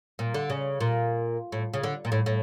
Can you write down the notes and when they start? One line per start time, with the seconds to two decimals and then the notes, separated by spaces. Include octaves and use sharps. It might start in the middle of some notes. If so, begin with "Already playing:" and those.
0.19 A#2
0.34 D3
0.50 C#3
0.80 A#2
1.52 A2
1.73 C#3
1.83 D3
2.05 A#2
2.12 A2
2.26 A2